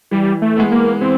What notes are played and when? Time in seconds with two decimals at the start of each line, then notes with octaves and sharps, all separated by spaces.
0.11 E3 G3
0.42 A3
0.57 G#3 B3
0.71 A#3
1.01 E3 C4